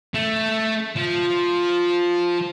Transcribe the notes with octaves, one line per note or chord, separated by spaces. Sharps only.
A3
F3